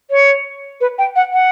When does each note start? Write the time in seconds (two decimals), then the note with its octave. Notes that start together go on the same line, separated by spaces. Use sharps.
0.11 C#5
0.81 B4
0.98 G5
1.16 F#5
1.33 F#5